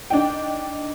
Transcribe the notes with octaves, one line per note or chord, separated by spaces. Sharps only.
D4 D#4 G5